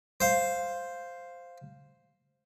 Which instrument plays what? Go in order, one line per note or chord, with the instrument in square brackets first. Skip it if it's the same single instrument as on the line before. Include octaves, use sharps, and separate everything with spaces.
[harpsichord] C5 F5